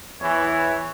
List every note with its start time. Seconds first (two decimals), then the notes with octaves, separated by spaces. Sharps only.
0.21 E2 E3 C#5